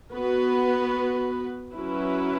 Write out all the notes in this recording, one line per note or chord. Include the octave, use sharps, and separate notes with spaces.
B3 F#4 B4
F#3 C#4 E4 B4